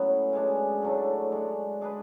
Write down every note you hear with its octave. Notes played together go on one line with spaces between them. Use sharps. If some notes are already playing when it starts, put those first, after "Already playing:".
Already playing: A2 F#3 B3 C#4 B4
C#3 G#3 D4
A2 F#3 A3 D4
G#3 D4 F#4
G#3 D4 G#4 B4